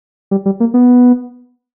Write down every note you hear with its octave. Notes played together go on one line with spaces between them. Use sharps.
G3
G3
A#3
B3